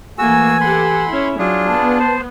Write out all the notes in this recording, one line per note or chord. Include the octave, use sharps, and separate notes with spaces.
E3 A3 A#3 F#4 G#5 E6
G4 A4 F#5 B5 C6
C#4 E4
F#3 D4 F4 G#4
B3 A5
C5